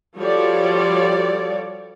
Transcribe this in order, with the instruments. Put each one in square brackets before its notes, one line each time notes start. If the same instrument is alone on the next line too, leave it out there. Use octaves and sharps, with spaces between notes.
[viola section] F3 G3 F#4 A4 C#5 D5